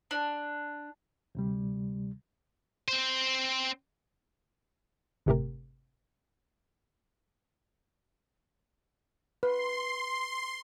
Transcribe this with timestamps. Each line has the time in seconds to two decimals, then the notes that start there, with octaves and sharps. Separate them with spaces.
0.11 D4
1.35 D2 C3 G3
2.88 C4 C5
5.26 G1 A2 C3 A3 G4 A#4
9.43 B4 C6